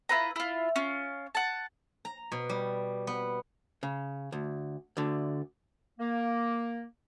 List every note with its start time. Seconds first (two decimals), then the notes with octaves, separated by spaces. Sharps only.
0.09 E4 F4 B4 A#5
0.36 E4 F4
0.76 C#4 F4
1.35 F#5 A5
2.05 A#5
2.32 B2
2.49 G3
3.07 B3
3.83 C#3
4.32 D2
4.97 D2 D3
5.99 A#3